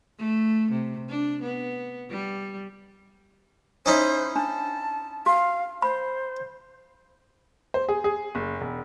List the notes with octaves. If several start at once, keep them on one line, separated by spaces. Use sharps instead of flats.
A3
C3
D4
B3
G3
C#4 D#4 E4 C5
D4 A5
F#4 F5
C5 B5
C5
G#4
G#4
F#1
E1